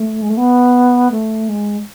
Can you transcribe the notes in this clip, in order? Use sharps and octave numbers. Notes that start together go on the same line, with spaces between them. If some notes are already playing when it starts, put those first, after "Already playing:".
Already playing: A3
G#3
A3
B3
A3
G#3